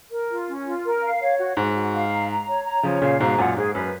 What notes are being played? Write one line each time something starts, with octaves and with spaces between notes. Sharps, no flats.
A#4
F4
C#4
F4
A#4
F5
C#5
F#4
G#2 F#4
F#4
F5
A#5
A#5
C#5
A#5
C#3 F3 C#5
A#2 C#3 F5
G#2 B2 A#5
F#2 A#2 F#5
G#2 G#4
F#2 B4